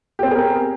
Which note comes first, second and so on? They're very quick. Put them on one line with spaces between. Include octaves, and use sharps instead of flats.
G4 C4 B3 G#4 A#4